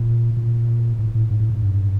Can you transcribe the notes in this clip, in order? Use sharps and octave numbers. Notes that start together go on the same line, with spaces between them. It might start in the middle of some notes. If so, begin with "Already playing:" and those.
Already playing: A#2
A#2
A2
A2
G#2
A2
G#2
G2